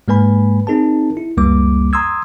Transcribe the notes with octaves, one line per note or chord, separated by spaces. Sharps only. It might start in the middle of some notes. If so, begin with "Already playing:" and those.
G#2 G#3 A#3 B4 G#5 B5
C4 D#4 G#4 A#4 A5
E4
C#2 F#2 G3 A#3 D6
A#5 C6 D#6 E6 G#6